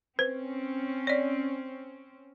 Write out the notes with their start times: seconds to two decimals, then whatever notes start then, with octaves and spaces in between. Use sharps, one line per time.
0.19 C4 C#4 B4 C5
1.07 C#5 D5